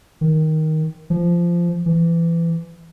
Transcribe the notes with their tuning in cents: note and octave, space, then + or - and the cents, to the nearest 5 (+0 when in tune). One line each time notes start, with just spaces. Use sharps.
D#3 +10
F3 -15
E3 +25